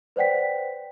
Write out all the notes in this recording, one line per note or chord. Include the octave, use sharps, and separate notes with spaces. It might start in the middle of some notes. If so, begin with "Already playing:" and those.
B4 C5 D5 F#5 G5 B6